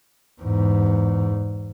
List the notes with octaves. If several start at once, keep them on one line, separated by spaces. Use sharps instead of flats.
E2 G#2